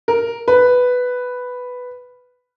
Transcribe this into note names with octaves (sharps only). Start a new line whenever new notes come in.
A#4
B4